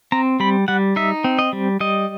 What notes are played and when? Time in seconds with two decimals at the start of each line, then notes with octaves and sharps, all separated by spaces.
0.12 C4 A#5
0.40 G3 B5
0.68 G3 F#5
0.96 D#4 E5
1.24 C4
1.39 D#5
1.53 G3
1.80 G3 D#5